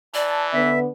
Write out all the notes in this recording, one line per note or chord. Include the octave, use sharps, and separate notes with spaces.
E3 D5 A5
D3 B3 E5